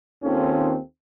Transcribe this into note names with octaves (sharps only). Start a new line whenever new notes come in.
D#2 D#3 C4 C#4 F4 A4